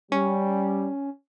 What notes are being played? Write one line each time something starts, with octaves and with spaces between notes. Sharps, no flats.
G3 C#4